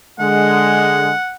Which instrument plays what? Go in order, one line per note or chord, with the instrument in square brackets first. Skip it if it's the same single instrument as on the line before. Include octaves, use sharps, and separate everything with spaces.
[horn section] D3 G#3 [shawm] F#5